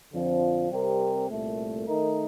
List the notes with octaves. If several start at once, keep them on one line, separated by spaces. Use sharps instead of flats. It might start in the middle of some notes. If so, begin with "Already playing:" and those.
F2 D3 F3 C4
C3 G3 C4 G4 A#4
C2 A#2 A3
D#3 A3 D#4 A#4